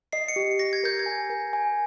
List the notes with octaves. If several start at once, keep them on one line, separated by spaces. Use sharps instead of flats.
D#5 C7
C#7
G4
G4 A#6
G#6
A#4 G6
G#6
G#5
A#4
G#5